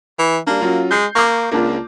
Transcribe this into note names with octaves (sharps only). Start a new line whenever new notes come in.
E3
G3 A#3 D4
F#3 C#4 F4
G#3 G6 C7
A#3 C#6 D6
C#2 A#3 D4 F4